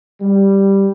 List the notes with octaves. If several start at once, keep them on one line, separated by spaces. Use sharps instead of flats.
G3